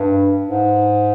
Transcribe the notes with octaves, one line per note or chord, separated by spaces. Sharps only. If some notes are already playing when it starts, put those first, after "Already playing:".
Already playing: G2
G#2